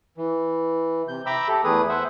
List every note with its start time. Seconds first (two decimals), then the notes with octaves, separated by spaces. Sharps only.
0.18 E3
1.08 C3 G6
1.26 E5 G5 A#5 B5 D6 E6
1.48 G4 A4
1.64 E2 A3 G#4 B4 D#6
1.89 C5 E5 F#5